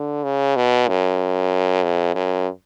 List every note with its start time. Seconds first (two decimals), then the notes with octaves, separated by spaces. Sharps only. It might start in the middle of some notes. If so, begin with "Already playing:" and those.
Already playing: D3
0.24 C#3
0.56 B2
0.88 F#2
1.83 F2
2.14 F#2